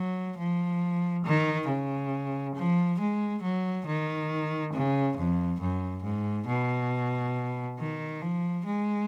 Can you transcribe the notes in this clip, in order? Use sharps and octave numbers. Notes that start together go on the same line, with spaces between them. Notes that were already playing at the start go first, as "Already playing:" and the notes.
Already playing: F#3
F3
D#3
C#3
F3
G#3
F#3
D#3
C#3
F2
F#2
G#2
B2
D#3
F3
G#3